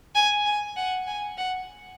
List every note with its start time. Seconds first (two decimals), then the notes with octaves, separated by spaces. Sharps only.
0.15 G#5
0.45 G#5
0.76 F#5
1.07 G#5
1.38 F#5